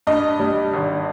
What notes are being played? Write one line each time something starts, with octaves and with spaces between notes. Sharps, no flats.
G2 D#5
G3
G#1